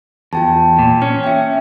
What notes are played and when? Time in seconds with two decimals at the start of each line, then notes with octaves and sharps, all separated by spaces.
0.33 E2 F4 G5 A5
0.79 A#2
1.02 C#4 F6
1.24 E5 G5